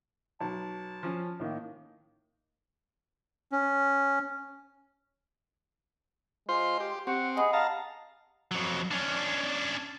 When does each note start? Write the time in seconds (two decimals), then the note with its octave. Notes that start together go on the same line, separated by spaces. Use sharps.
0.41 B1 A5
1.03 F3 C#4
1.40 A2 D#3 A#3
3.52 C#4
6.49 G#3 F4 C5 C6
6.80 G4
7.07 C4 G4 F#5
7.37 G#4 D#5 F#5 B5
7.53 F5 A5 A#5
8.51 F2 F#3
8.91 C#4 D4